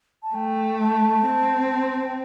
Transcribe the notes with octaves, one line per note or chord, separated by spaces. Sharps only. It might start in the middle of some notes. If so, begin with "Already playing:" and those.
A5
A3 G5
A5
C4
A5
C6
A5
G5